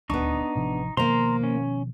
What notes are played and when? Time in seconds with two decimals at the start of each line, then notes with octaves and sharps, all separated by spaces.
0.10 D#1 D2 B3 D4 D#4 C#6
0.56 A1 C3 F3
0.97 B2 D#3 F3 A#3 C5 A#5 C6
1.43 C#4